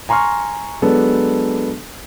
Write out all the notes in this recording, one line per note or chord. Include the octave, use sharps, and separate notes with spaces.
G#5 A#5 C6 C#6 F6
F#3 G#3 B3 D4 A4